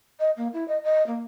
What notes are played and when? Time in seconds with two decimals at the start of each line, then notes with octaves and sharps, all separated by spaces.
0.20 D#5
0.37 A#3
0.53 E4
0.68 D#5
0.83 D#5
1.07 A#3